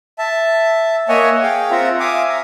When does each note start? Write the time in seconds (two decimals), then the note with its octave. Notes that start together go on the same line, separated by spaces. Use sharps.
0.19 E5 A5
1.09 A#3 C#5 D#5 E5 F#5 G#5
1.42 G#4 F5 G5
1.71 C4 F4 E5 F#5 A#5
2.00 E5 F5 G#5 D6 D#6
2.29 E5 A#5